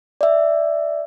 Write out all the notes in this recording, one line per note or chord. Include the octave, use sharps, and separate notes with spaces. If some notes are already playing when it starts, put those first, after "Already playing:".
D5 E5